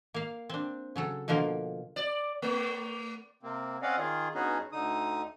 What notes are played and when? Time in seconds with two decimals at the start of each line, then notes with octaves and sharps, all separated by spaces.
0.14 A#3 F5
0.50 C4 D4
0.96 C#3 F#3 A4
1.28 B2 D3 F3 A#3 F4 A#4
1.96 D5
2.42 A3
3.43 C3 A#3 C4
3.82 C4 C#4 D5 D#5 F5 F#5
3.98 D#3 F4 G#4
4.35 G2 B3 C#4 D#4 F#4 G#4
4.72 D2 D3 D#4 D#6